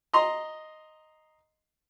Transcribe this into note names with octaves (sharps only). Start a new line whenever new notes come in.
D#5 A#5 C6